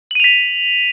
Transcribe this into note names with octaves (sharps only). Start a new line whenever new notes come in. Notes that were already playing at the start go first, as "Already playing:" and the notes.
B6 D#7 F7 F#7